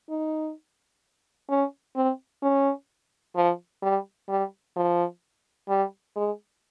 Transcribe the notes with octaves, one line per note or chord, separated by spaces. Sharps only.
D#4
C#4
C4
C#4
F3
G3
G3
F3
G3
G#3